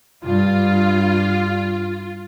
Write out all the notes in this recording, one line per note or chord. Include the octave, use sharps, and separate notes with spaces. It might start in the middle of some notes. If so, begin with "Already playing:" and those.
G2 F4